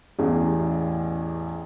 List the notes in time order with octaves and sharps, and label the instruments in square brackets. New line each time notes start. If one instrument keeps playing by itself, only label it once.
[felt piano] A1 E2 C#4 G#4